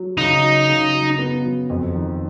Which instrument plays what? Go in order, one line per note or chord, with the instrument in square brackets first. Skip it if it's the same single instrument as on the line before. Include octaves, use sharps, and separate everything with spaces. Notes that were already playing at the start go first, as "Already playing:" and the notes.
Already playing: [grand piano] F#3
[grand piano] C#3 [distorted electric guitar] D#4
[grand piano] F#3
C#3
F#3
B3
F#3
F2
D#3